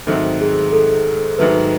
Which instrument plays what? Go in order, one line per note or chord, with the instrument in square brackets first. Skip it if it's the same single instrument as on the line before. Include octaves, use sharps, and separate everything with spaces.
[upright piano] G#2 D#3 F#3 A3 C4 [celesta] A4
[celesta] G#4
A4
[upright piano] G#2 D#3 F#3 A3 [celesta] B4